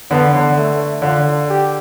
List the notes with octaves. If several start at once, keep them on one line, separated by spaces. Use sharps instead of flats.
D3 B3
D3
A3
D3 F4
G4